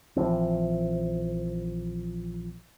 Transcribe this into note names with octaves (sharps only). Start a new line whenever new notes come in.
A#1 E3 F3 C4